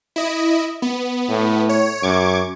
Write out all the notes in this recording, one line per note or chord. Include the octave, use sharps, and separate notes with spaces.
E4 D#5
B3
A2
C#5
F#2 C#6 D6 G#6